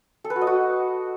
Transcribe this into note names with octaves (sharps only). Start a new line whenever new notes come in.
A4
B4
F#4
D#5
F#4